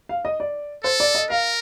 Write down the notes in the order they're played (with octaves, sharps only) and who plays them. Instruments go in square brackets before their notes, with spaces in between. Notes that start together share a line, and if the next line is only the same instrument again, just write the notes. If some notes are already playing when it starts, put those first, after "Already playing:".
[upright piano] F5
D#5
D5
[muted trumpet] A4 [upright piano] C5
[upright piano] D5
D#5
[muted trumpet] A#4 [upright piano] F5